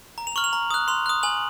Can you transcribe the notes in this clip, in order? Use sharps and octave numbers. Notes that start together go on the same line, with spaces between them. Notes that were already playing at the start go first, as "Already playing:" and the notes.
A#5
F7
C#6 F6 F#7
F7
A#5
D#6 F#6
C6 F7
D#6 F#6
G#5 F#7